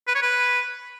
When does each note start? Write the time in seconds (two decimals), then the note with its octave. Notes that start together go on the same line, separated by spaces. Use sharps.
0.08 B4
0.15 C#5
0.22 B4